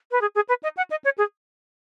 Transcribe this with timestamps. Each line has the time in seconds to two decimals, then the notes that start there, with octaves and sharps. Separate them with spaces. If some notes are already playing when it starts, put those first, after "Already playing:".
0.11 B4
0.21 G#4
0.35 G#4
0.49 B4
0.63 D#5
0.77 F#5
0.90 D#5
1.04 C#5
1.18 G#4